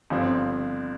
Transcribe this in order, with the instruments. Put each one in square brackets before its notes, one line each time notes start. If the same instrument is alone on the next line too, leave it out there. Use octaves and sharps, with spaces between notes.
[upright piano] G1 G2 F3 C4